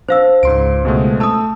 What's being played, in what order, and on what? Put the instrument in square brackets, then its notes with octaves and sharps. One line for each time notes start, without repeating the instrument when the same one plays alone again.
[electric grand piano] D4 [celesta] C5 F5 E6
[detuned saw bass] C#2 [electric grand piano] G#2 C6 D7
[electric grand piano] B2 G#3 A3
[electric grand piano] A3 E6 [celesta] A5 D#6